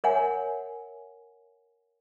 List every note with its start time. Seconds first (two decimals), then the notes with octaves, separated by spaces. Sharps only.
0.04 A#4 C#5 E5 F#5 G#5